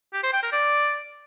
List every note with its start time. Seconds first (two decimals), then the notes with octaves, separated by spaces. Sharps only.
0.13 G4
0.23 C5
0.33 G5
0.43 A#4
0.53 D5